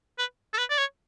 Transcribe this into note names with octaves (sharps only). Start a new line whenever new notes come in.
B4
A4
B4
D5
C#5